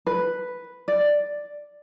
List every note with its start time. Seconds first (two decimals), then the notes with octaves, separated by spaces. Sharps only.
0.06 B4
0.88 D5